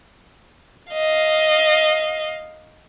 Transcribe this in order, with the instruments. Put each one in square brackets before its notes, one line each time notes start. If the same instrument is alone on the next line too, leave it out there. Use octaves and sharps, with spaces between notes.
[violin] D#5 F5